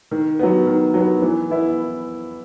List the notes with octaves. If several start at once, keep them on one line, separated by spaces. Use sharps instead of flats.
D#3
F#3 B3
D#3
F#3 B3
E3
B3 E4